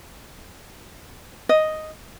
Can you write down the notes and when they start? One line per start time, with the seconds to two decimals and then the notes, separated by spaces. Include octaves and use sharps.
1.49 D#5